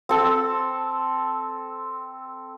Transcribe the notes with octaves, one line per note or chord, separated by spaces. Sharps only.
C4 A4